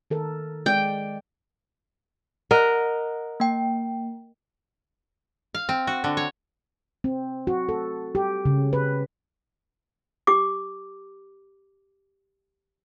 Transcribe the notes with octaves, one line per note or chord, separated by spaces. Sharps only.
D#3 A4 A#4
G#3 D5 G5
A#4 D#5 F#5 F#6
A#3 G5
F5
C4
F#4
D3
C#5
C4
F#4
A4
G4
C#3
B4
G4 D6